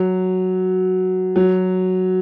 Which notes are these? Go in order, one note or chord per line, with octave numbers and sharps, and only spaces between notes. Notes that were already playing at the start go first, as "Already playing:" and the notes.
Already playing: F#3
F#3